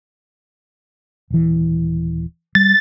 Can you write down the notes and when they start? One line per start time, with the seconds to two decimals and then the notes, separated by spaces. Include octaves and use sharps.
1.30 D#1 E3
2.55 G3 A6